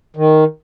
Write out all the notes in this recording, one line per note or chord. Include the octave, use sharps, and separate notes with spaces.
D#3